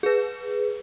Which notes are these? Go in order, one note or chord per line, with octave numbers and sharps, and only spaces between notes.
G#4 B4